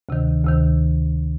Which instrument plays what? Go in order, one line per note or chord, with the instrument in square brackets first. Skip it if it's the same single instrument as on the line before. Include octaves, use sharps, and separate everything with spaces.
[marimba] D2 C3 D#3
D2 C3 D#3